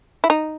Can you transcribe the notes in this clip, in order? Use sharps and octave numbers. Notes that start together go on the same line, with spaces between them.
E4
D#4